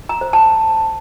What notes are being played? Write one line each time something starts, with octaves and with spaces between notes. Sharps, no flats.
A#5
C5
A5